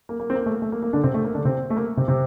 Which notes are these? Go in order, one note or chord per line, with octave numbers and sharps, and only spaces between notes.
A#3
A#3
C4
A#3
A3
A#3
A3
A#3
A#3
D3 D4
C3 C4
A3
A#3
D3 D4
C3 C4
A3
A#3
C3 C4
C3 C4